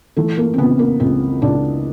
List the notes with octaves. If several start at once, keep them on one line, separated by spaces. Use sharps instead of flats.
E3 A3
A#3
C4
C#3 B3
A#3
C#2 C4
C#2 D4